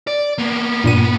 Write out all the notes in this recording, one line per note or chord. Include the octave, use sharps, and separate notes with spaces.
D5
A#3 B3
G2 A#2 D#7